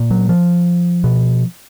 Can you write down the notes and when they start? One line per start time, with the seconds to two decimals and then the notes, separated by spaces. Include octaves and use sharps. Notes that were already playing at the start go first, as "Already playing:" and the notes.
Already playing: A#2
0.11 F#3
0.29 F3
1.04 B2